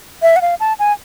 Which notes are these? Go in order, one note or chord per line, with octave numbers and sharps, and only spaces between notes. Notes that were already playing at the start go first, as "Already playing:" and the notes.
E5
F#5
F5
A5
G#5